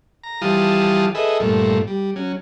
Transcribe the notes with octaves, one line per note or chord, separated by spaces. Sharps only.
A#5
E3 F3 G3 F5 A5 D#6
G#4 A4 B4 D#5 E5
G2 A#2 F3 A3
G3
F#3 C#4